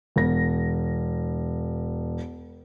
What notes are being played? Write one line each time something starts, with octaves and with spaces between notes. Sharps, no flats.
E1 A#6